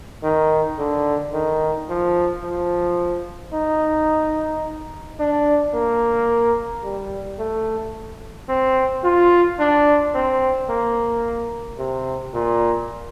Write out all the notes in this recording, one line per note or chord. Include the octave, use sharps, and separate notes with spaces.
D#3
D3
D#3
F3
F3
D#4
D4
A#3
G3
A3
C4
F4
D4
C4
A#3
C3
A#2